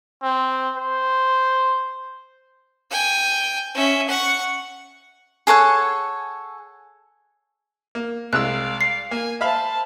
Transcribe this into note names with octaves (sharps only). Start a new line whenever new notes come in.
C4
C5
G5 G#5
C#4 E5
F#5 C#6
G#4 A4 C#5 F#5
A#3
C2 G#3 D5 F5 E6 F#6
C7
A#3 G#5
C5 E5 F5 A5 B5